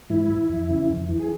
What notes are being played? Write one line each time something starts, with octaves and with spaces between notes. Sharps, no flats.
G#2 E3 E4
E3
F2
C#3 E3
F2
E3
G#4